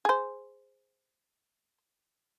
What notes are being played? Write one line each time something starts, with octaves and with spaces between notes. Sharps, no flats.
G#4 C5